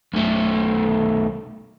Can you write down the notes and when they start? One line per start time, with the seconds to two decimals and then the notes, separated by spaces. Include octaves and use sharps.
0.14 B1 A3